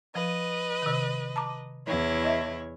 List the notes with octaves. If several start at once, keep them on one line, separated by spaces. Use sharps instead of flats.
F3 B4 D#5
C3 D#3
A5 A#5 D6
E2 E4 C#5
D#5 E5